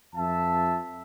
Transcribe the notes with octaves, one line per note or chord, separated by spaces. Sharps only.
F2 F4 E5 A5